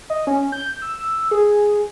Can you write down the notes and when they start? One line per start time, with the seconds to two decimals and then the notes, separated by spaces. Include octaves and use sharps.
0.10 D#5
0.27 C#4
0.52 G6
0.82 E6
1.31 G#4